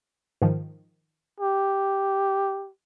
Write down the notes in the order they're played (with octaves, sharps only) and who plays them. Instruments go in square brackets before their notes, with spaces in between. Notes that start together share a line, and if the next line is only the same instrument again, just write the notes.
[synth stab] G#2 D#3 F3
[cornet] G4